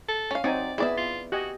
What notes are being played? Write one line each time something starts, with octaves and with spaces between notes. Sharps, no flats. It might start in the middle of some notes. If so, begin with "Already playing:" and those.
A4
C#4 F5
F#3 C4 D#4 D5 G#5
B3 E4 G#4 D5 E5
F4
F#4 G4 D#5 G#5